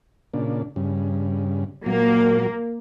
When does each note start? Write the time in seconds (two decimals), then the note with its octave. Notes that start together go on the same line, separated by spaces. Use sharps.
0.34 A#2 C#3 D4
0.76 G2 C#3
1.86 A#2 F#3 A#3